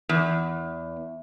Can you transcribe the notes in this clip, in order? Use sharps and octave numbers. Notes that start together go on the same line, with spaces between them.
E2